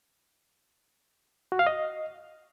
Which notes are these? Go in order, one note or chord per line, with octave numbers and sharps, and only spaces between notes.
F#4
F5
D#5